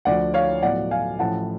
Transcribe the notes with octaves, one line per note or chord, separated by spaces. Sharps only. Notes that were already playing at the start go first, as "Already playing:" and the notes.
D2 D3 F3 D5 F#5
C#5 F5
B1 A2 F3 D5 F#5
F5 G#5
A1 A2 F3 F#5 A5